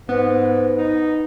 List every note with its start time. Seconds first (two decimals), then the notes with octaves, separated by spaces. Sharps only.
0.09 G#2 B3
0.78 D#4